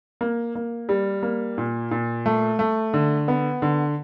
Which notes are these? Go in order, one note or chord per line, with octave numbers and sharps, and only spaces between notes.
A#3
A#3
G3
A#3
A#2
A#2
A3
A3
D3
B3
D3